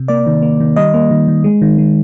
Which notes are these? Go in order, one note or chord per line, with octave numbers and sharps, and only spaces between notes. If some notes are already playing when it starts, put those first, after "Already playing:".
Already playing: C3
A#3 D5
D#3
A#3
D#3
G3 D#5
A#3
D#3
D#3
G#3
D#3
G#3